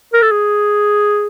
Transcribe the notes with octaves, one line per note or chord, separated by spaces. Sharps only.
A#4
A4
G#4